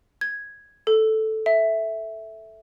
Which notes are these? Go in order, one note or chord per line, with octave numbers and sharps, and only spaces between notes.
G#6
A4
E5